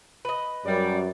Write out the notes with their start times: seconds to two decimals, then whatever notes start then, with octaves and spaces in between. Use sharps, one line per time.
0.25 B4 D#5
0.65 F#2 G3 D5